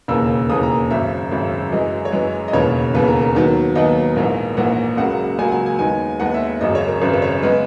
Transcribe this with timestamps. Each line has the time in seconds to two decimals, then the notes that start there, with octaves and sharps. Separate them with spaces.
0.08 E1 D#2 C#3 E3 A#3 E6
0.49 E1 D#2 C#3 E3 A#3 D#6
0.63 A#5
0.91 G#1 F#2 C#3 E5
1.32 G#1 F#2 C#3
1.72 F#2 E3 G#3 D#5
2.05 C#5
2.12 F#2 E3 G#3 B4
2.48 D#5
2.53 E1 D#2 C#3 E3 B3 C#5
2.94 E1 D#2 C#3 E3 B3 B4
3.08 A#4
3.22 A#4
3.35 D#2 D#3 F#3 B3
3.75 D#2 D#3 F#3 B3 D#5
4.16 A#1 G#2 E3 A#3
4.57 A#1 G#2 E3 A#3 F#5
4.97 C#2 C#3 F#3 A#3 F#5
5.39 C#2 C#3 F#3 A#3 G#5
5.48 F#5
5.52 G#5
5.66 G#5
5.79 D#2 D#3 G#3 B3 G#5
6.20 D#2 D#3 G#3 B3 F#5
6.34 E5
6.48 E5
6.61 G#1 F#2 C#3 D#5
6.75 C#5
6.88 A#4
7.02 G#1 F#2 C#3 B4
7.13 B4
7.22 C#5
7.42 C#3 G#3 B3 B4